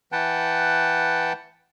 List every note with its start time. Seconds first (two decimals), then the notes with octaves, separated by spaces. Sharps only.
0.12 E3 B4 F#5 G5 A5